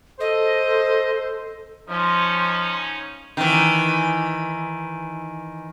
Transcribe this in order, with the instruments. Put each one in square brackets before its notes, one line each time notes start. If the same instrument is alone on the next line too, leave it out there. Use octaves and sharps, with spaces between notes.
[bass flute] A4 [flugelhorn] C5 [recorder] D#5
[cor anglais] F3 [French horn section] C#4 D#4 [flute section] C6
[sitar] D#3 E3